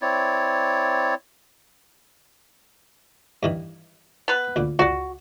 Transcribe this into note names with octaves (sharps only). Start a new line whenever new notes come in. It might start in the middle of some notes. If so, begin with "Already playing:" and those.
C4 E4 C#5 D5
G2 D#3 E3
B3 B4
D2 A#2
C#2 F#4 D5